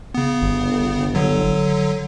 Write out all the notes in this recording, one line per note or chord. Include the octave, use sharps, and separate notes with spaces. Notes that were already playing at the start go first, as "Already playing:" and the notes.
C#3 B3
G1
D3 F#3